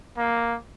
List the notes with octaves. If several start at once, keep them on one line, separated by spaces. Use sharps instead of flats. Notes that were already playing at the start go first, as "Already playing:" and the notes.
A#3